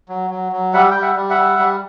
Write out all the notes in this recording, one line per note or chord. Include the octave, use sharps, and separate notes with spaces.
F#3
F#3
F#3
G3 E5 F#5
G3 G5
E5 F#5
G3
E5 F#5
G3
G3